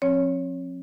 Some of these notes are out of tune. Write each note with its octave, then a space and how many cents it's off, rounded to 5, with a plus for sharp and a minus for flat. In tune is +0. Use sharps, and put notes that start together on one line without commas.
F3 +30 C4 +45 C#5 +10